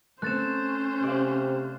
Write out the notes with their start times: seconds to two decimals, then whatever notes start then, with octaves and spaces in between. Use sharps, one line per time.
0.22 A3 C4 C#4 C5 F#6 A6 E7
1.03 C3 D5 F5